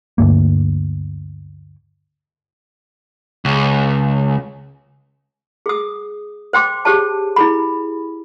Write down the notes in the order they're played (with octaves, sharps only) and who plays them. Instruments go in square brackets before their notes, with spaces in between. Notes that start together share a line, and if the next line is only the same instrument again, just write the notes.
[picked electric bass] D2 G2 A#3
[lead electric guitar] C#2
[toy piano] G#4 D#6
C5 G5 C6 D6
G4 G#4 C5 C#5 A5
E4 G#4 B5